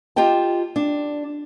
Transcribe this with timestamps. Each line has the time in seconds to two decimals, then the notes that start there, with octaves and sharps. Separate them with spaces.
0.16 F4 G4 D#5 G5 A5
0.76 D4